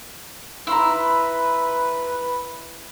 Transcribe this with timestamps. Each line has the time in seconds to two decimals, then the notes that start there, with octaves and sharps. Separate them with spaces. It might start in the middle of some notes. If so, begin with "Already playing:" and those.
0.67 E4 B4 A#5 C6 E6